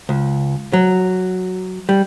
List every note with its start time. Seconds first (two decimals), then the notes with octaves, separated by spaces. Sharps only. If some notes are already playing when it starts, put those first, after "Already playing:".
0.09 C#2
0.73 F#3
1.89 G3